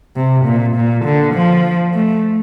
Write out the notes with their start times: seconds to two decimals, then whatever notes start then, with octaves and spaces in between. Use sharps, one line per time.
0.16 C3
0.45 A#2
0.76 A#2
1.05 D3
1.34 F3
1.94 A3